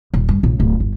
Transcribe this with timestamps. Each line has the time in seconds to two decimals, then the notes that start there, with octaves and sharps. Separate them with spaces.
0.14 D#1
0.29 G2
0.43 A#1 C#3
0.60 D1
0.80 G1